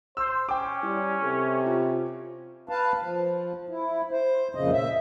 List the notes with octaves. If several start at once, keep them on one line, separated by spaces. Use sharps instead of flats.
C5 E6
C#4 G5 D6
G3 E4 C#5
C3 A4
F4
B4 F5 A5
F3
E4
C5
F2 A#2 C#3 D#5
E5